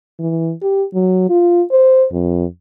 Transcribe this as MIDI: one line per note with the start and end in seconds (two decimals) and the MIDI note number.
0.19 0.52 52
0.62 0.84 67
0.94 1.28 54
1.29 1.62 65
1.71 2.06 72
2.12 2.45 41